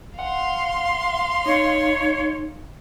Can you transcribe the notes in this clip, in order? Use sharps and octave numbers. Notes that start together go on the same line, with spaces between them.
F5 F#5 C6
D#4 C#5